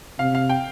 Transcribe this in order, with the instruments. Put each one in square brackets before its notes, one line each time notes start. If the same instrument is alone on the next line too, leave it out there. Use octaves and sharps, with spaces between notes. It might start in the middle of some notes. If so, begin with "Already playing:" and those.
[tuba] C3 [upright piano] F5
[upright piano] F5
G5